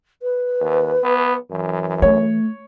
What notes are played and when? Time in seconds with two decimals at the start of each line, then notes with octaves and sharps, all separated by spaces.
0.22 B4
0.61 D#2
1.03 B3
1.51 F#2 E3
2.02 A3 C#5